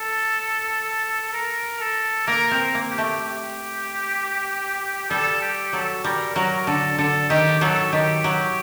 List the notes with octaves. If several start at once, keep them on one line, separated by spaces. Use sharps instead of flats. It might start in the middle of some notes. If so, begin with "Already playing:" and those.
Already playing: A4
A#4
A4
A#3 A#4
C4
A#3
G4
A3
G4
G3 A4
G4
F#3 A4
G3 A#4
F#3 A#4
D3 A4
D3 A4
D#3 G4
F#3 A4
D#3 G4
F#3